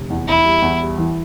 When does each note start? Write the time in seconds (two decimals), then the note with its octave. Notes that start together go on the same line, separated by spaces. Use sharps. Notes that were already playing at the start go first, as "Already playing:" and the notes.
Already playing: F1
0.10 E2
0.27 E2 E4
0.45 G3
0.62 E2
0.80 G3
0.98 E3